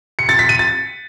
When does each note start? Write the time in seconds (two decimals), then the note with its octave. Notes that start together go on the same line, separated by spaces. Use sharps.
0.19 C#7
0.29 A6
0.39 B6
0.49 D#7
0.59 A6